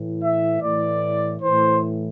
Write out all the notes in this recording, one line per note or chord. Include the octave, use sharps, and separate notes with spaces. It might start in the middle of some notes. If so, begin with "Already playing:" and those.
Already playing: A2 E3
E5
A2 E3 D5
A2 E3 C5